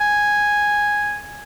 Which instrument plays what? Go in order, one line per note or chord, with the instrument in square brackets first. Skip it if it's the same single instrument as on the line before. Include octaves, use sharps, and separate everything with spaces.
[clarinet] G#5